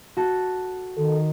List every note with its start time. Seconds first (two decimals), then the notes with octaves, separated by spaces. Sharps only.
0.17 F#4 A4
0.97 D#3 A4